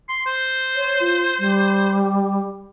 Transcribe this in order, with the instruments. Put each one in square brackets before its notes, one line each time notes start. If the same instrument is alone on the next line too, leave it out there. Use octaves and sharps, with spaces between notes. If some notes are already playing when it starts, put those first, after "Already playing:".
[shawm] C6
C5
[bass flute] C#5
F4
G3